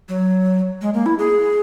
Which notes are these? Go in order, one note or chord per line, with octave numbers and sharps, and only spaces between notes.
F#3
G#3
A#3
E4
G#4